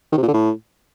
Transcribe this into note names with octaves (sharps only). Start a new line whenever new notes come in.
D#3
C3
A#2
D3
A2